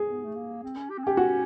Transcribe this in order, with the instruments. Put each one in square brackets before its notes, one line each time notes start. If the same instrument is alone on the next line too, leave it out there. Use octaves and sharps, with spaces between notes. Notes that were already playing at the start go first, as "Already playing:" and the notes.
Already playing: [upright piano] G#4
[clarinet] B3
A3
A#3
C4
C#4
G4
C4
[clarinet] C#4 [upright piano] G4
[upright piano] F#4